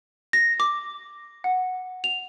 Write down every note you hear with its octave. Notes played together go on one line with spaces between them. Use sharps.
A#6
D6
F#5
F7